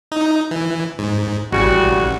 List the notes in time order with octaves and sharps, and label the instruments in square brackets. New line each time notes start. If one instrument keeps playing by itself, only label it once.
[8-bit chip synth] D#4
E3
G#2
[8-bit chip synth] A1 [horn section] C#3 G3 F#4